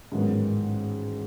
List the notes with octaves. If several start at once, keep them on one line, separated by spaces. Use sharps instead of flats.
A1 G#2 D#3 F#3 B3